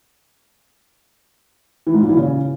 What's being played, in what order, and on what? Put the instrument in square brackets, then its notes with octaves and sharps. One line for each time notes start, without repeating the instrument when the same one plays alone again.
[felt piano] E3
G#2
A#2
E3
C#3